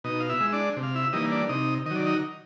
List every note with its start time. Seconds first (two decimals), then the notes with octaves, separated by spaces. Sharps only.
0.04 B2 D#4 D#5
0.20 F5
0.29 E4 E5
0.41 G#3
0.52 D4 D5
0.77 C3
0.83 F5
0.95 E4 E5
1.13 E3 G3 A#3 D#4 D#5
1.32 D4 D5
1.49 C3 D#4 D#5
1.86 D#3 F#3 D#5
1.96 D5
2.06 D#4 D#5